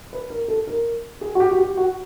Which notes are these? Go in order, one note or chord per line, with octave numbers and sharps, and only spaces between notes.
B4
A#4
A4
A#4
G#4
F#4
G4
F#4
G4
F#4